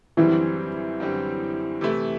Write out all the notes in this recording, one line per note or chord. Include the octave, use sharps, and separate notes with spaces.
F#2 D3 E3 G3 C4
F#2 D3 G3 C4
C3 E3 A3 E4